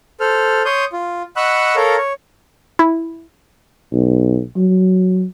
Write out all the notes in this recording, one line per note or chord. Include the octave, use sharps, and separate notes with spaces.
A4 C5 F6
C#5 C6 D#6 G6
F4
D#5 F#5 B5 C#6 E6 F#6
A4 A#4 C#5 F5 A#5
C#5
E4
B1
F#3